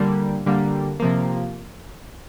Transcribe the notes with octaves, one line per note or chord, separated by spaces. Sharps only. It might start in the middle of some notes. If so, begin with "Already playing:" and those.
Already playing: D3 G3 A#3
D3 G3 A#3
C3 F3 A#3